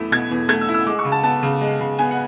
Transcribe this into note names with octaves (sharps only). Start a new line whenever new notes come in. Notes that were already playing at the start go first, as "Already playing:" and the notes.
Already playing: E2 A3 E4
B2 G#6
E2
A3 G#6
E6
E4
E6
G#3 D6
C#6
C#3
A5
B3 A5
C#3
G#3
C#3
B3 G#5
F#5